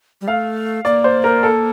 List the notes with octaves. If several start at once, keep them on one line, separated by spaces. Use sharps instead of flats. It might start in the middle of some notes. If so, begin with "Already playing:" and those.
G3
A3 F5
A#3 D5
C5
A#4
A4